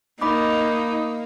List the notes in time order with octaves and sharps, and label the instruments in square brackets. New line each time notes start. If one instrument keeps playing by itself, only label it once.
[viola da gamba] A#3 [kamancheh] D#4 [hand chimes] D#5 B5 D6